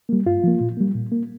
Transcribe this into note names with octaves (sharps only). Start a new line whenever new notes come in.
G3 A#3
G2 F4
F3 A#3
A#2
G3 A#3
A#2
A#3